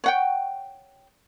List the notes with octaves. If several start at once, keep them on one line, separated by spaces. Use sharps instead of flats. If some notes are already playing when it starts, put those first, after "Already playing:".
C#5 F#5 G5